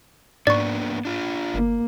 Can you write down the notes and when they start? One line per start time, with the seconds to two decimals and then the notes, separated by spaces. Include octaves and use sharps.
0.47 G#2 A#3 B3 D4 D5 C#6
1.05 D4 F4
1.54 G1 A#3